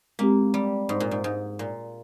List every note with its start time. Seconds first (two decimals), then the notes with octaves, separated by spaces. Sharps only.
0.19 G#3 A#3 C4 G4
0.54 G3
0.89 G#2
1.00 A#2
1.11 G#2
1.24 G#2
1.59 A#2